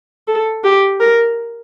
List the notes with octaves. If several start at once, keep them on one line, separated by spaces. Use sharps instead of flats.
A4
G4
A#4